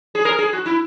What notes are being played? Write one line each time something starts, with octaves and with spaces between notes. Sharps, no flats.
G#4
A#4
G#4
F#4
E4